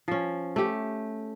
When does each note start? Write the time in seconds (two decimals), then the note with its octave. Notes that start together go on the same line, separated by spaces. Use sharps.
0.08 F3 C#4
0.56 A3 G4